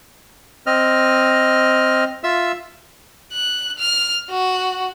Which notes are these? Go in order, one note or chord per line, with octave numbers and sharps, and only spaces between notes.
C4 D#5 F6
F4 E5 E6
F#6
F6
F#4